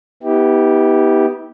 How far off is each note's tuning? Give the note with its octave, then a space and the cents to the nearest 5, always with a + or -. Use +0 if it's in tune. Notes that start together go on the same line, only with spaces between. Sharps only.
B3 +0 E4 -40 G4 +0